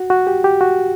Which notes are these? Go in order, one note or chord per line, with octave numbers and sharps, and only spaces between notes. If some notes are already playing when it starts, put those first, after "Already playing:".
Already playing: F#4
F#4
G4
G4
F#4